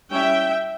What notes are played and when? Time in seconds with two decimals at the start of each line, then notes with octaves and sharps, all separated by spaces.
0.12 G3 C#4 E4 E5 G5